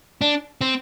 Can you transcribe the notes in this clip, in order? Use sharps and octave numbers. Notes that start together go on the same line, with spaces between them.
D4
C4